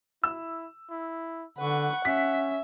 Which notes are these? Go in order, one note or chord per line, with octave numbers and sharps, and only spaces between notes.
E4 E6
E4
D3 B4 F#5 C#6
C#4 E5 B6